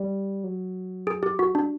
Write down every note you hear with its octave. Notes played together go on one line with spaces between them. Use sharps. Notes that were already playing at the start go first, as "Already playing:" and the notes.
Already playing: G3
F#3
G#4
G4
F#4
G#3 D4
G3